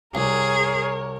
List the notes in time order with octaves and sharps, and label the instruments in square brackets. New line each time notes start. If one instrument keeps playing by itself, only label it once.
[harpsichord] C2 [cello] G#4 [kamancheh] A#4 C#5